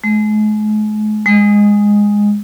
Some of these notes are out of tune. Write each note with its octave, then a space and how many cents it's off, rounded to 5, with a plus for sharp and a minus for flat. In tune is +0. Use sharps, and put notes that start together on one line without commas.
G#3 +45
G#3 -10